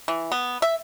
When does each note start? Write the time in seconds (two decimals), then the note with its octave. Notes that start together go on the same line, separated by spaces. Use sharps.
0.08 E3
0.32 B3
0.62 E5